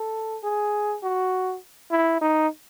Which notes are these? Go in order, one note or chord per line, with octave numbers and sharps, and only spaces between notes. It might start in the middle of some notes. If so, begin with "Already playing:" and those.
Already playing: A4
G#4
F#4
E4
D#4